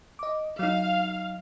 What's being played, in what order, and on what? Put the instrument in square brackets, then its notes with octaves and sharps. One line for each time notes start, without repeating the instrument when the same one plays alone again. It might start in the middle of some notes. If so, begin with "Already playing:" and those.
[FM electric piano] D#5 D6
[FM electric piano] F#3 D#4 [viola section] F5